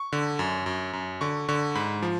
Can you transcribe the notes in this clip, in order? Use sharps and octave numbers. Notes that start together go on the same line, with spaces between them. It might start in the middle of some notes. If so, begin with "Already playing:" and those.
Already playing: C#6
D3
F#2
F#2
F#2
D3 C#6
D3 C#6
G#2 B5
F3